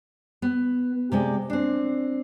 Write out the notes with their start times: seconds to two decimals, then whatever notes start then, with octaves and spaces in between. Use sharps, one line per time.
0.42 B3
1.12 C3 G#3 C#5 D5
1.50 C4 D4